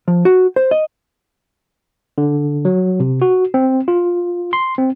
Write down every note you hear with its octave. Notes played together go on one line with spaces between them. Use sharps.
F3
F#4
C5
D#5
D3
F#3
C3
F#4
C4
F4
C6
C4